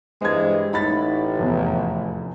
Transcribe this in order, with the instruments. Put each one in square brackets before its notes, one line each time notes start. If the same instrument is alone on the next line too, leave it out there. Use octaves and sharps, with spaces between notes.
[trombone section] G2 E3 G#3 [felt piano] C5 G#6
[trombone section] A1 [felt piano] D#4 B5 A6
[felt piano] F1 E2